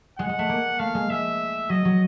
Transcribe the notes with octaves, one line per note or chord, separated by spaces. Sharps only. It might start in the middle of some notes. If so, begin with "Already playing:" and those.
G#3 F#5
G#3
A3
A#3
A3 F5
G#3
G#3 E5
F#3 D#5
F#3